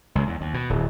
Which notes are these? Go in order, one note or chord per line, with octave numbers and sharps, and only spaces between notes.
C#2
E2
D#2
B2
D1